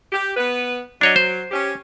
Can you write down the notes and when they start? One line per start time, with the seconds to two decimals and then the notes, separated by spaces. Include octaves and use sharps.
0.12 G4
0.37 B3 B4
1.01 F#3 D4 C#5 D#5
1.16 C5
1.51 C#4 G4